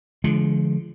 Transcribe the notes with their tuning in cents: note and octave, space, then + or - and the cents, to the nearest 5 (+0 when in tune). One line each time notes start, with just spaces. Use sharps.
D3 -5 F3 -25 G#3 +30